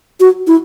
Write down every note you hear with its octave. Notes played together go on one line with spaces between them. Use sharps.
F#4
E4